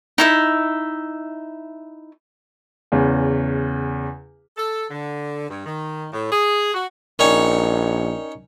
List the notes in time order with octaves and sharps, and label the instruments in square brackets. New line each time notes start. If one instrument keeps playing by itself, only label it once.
[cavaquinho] D#4 E4 E5
[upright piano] E2 C#3
[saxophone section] A4
D3
G2
D#3
A2
G#4
F#4
[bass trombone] A#1 [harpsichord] C#4 D#4 C#5 [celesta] A#4 D5 G5